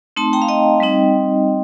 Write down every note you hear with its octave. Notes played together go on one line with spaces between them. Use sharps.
A3 C4 D#4 A5 C6
G5 A#5
F5
D#5 G5
G3 C4 D#4